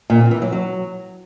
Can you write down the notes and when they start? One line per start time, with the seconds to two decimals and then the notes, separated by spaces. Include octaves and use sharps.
0.10 A#2
0.20 C4
0.31 E3
0.42 F#3
0.52 F#3